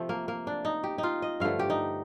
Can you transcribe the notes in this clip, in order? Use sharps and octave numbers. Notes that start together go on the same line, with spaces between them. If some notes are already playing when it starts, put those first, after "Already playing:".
Already playing: C3 F3 A3
A#3
A#3
D4
D#4
G4
D#4
F4
D#5
G2 D3 F3 A3 F5
G4
D#4